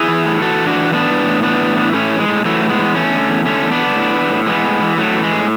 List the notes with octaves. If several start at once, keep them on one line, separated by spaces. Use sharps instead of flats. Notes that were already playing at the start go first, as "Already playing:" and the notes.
Already playing: E4 G#4
E3
A2
E3 F#4 A4
A2
D4 F#4
E3
A2 B3 D4
E3
A2
E3 B3 D4
A2
E3
A2 A3 C#4
E3
G#3
A2
E3 F#3 A3
A2
G#3 B3
E3
E2 A3 C#4
D3
E2
D3 A3 C#4
E2
B3 D4
D3
A2
E3
A2
E3 G#3 B3
A2
E3
A2 F#3 A3
E3
G#3
A2